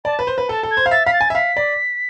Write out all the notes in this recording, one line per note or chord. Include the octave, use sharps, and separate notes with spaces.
D5 A5
B4
C5
B4
A4 A5
A4
G#6
C5
F5
E5 A6
F5 B6
A6
G#5
E5
F5 B6
D5